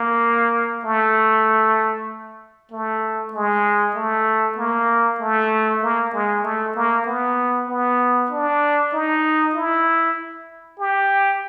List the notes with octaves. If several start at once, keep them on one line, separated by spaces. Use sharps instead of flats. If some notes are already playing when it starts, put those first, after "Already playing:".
Already playing: A#3
A3
A3
G#3
A3
A#3
A3
A#3
G#3
A3
A#3
B3
B3
D4
D#4
E4
G4